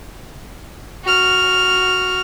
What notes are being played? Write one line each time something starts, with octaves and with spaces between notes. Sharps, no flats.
F#4 F6